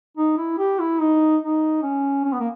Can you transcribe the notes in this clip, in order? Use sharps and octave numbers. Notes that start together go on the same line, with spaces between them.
D#4
E4
G4
E4
D#4
D#4
C#4
C#4
B3
A#3